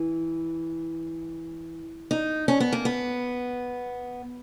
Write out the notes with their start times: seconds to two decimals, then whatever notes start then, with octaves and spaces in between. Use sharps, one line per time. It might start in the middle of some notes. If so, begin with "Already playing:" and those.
Already playing: E3
2.11 D#4
2.48 C#4
2.60 B3
2.73 A#3
2.85 B3